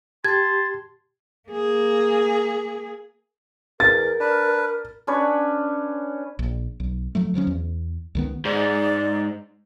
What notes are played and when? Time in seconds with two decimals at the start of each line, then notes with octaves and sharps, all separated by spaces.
0.24 G4 A5 C6 G#6
1.49 A#3 G#4
3.80 E2 A#4 A6
4.20 D4 B4
5.07 C#4 D4 B4 C#5
6.39 A#1
6.80 B1
7.15 F3 F#3 A3
7.34 D3 F3 F#3 C#4
7.47 E2
8.15 C#2 D#3 B3
8.45 G#2 D5